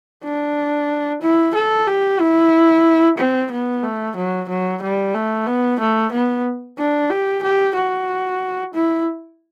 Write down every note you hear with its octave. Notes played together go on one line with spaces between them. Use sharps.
D4
E4
A4
G4
E4
C4
B3
A3
F#3
F#3
G3
A3
B3
A3
B3
D4
G4
G4
F#4
E4